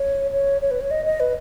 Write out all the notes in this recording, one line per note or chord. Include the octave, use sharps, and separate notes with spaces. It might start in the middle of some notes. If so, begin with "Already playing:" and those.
Already playing: C#5
C#5
C#5
B4
C#5
D#5
D#5
B4